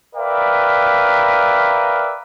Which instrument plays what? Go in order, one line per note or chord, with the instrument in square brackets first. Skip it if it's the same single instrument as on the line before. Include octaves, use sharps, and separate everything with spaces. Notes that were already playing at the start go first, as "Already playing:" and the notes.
[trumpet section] A#4 B4 D5 E5 F5 G5